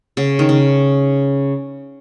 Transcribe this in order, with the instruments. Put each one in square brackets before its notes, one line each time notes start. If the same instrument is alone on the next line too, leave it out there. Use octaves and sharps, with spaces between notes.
[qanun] C#3
D#3
C#3